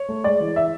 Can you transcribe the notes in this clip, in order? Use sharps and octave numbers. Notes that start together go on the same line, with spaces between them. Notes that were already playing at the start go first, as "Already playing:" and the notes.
Already playing: C#5
A3
G#3 D5
E3
E5